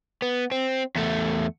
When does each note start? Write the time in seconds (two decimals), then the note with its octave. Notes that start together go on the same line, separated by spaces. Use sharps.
0.22 B3
0.52 C4
0.96 E2 A3